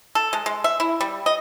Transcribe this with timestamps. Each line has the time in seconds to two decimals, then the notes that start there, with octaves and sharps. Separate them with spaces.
0.15 A4
0.33 G#3
0.46 G#3
0.64 E5
0.80 E4
1.01 G3
1.26 D#5